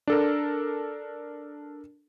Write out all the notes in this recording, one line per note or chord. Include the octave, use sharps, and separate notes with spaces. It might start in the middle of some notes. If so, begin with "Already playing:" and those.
D4 A4 A#4